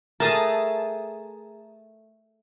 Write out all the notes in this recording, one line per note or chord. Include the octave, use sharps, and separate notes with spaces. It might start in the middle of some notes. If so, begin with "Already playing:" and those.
A3 G#4 A#4 A5 D#6